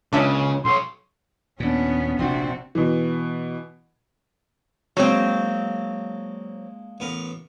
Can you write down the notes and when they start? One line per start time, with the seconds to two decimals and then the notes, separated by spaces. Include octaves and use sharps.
0.13 C#2 A#2 C#3 C#4 D4 E5
0.65 B1 C#5 C6
1.60 D#2 A#2 B3 C#4 D4
2.19 F1 A#1 C3 C4 D4 F#4 D5
2.75 B2 E3
4.97 F#3 G#3 A#3 C4 D4
7.00 A1 B3 A#4